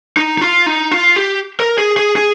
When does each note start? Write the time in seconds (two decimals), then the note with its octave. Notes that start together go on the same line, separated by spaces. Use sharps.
0.17 D#4
0.38 D#4
0.41 F4
0.66 D#4
0.92 F4
1.16 G4
1.60 A#4
1.78 G#4
1.97 G#4
2.16 G#4